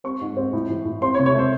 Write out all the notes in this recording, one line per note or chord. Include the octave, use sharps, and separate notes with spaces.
C4 C#6
G#2
C4
A2
E3
A2
C4 C6
C#5
C3
C#5
A3 C5